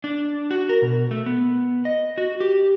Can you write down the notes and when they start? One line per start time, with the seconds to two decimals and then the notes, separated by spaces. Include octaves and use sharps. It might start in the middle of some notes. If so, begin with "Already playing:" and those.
0.04 D4
0.51 F#4
0.69 A#4
0.82 B2
1.11 A3
1.26 B3
1.85 D#5
2.18 F#4
2.41 G4